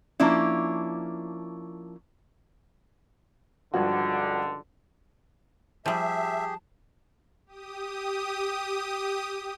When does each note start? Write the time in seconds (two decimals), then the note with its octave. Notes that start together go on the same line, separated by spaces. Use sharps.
0.20 F3 A#3 C#4 D4 E4
3.74 C#2 G2 D3 F3 F#4
5.86 F3 G3 G4 G#4 E5 A5
7.46 G4 D#6